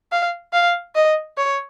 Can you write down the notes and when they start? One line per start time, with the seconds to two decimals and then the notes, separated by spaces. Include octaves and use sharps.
0.12 F5
0.53 F5
0.95 D#5
1.37 C#5